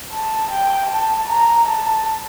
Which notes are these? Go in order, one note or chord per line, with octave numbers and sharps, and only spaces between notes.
A5
G5
A5
A#5
A5